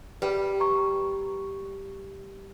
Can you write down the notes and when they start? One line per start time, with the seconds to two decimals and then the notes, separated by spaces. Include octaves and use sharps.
0.22 G3 B4
0.60 A#5 C#6